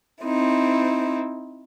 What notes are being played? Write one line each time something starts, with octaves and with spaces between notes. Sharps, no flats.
C4 D#4 E4